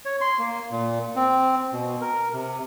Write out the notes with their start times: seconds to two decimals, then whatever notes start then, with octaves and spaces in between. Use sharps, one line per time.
0.05 C#5
0.21 C6
0.39 A#3
0.71 A#2
1.16 C4
1.73 B2
2.01 A#4
2.33 C3